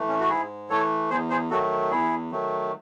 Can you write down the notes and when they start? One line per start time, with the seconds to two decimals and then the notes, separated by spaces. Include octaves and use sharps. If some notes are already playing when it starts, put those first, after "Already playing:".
Already playing: E3 A3
0.09 C#4
0.20 F#4
0.29 G#2 E4 G#4
0.69 E3 A3 A4 C#5
1.10 E2 G#4 C5
1.30 G#4 C5
1.50 D#3 F#3 A3 F#4 A4
1.91 E2 E4 G#4
2.32 D#3 F#3 A3